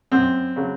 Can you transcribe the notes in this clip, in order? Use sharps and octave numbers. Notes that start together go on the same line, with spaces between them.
F#2 C4
C#3 F#3